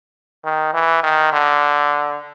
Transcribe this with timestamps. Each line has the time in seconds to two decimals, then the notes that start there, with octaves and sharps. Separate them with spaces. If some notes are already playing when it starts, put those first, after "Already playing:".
0.44 D#3
0.73 E3
1.03 D#3
1.32 D3